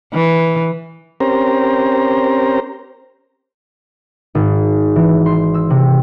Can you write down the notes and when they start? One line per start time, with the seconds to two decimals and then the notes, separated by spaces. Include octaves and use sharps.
0.14 E3
1.20 C4 C#4 G4 A#4 C5 A#5
4.35 G#1
4.96 E3
5.26 C6
5.54 E6
5.70 C3